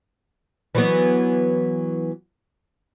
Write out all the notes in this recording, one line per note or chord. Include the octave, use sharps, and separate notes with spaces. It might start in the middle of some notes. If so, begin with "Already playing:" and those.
E3 F#3 B3